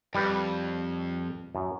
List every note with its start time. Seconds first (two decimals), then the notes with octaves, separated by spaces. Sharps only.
0.15 F2 G3 B4
1.55 F#2